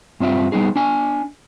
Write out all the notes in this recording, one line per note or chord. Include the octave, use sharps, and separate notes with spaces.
G2 C4 F4 E5
G3 B3 D#4 G#4
D4 G#5